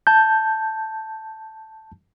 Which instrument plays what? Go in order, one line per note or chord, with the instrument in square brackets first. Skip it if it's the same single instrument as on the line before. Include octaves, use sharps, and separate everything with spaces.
[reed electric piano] A5 G6